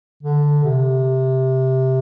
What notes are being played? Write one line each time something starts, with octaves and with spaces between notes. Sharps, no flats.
D3
C3